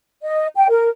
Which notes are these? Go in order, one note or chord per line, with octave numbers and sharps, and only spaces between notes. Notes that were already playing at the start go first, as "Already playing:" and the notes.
D#5
G5
A#4